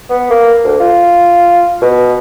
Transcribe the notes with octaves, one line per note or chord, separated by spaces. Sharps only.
B3
A#3
D2
F4
B2